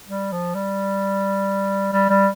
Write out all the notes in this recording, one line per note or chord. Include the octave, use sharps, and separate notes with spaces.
G3
F3
G3
G3
G3